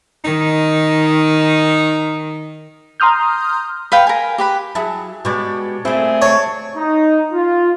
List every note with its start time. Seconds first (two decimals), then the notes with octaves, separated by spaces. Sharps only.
0.24 D#3 D#4
3.00 A#5 C6 D#6 F6 G6
3.92 B4 F5 G5
4.07 A#4 G#5
4.38 G4 B4 B5
4.75 F#3 E4 G#4 A5
5.25 B2 G#3 G4 C#5 D5
5.85 A#2 A3 C4 E4 G#4
6.22 C#5 A5 C#6
6.77 D#4
7.33 F4